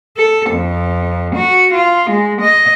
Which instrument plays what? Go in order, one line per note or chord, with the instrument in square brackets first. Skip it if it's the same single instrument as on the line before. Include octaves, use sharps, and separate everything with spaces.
[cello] A4
F2
F#4
F4
G#3
D#5